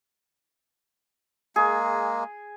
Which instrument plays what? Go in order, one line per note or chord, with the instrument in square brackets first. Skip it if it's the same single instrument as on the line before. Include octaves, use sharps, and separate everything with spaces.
[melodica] G#3 A#3 [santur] G#4